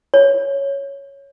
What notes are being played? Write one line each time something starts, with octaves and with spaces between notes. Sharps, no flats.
C#5